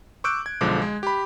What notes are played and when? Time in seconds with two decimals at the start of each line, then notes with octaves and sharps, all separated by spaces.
0.24 C#6 D6 E6 F#6 G6 D7
0.46 G#6
0.61 B1 D3 F3 G#3 D6
0.82 G#3
1.03 G4 B5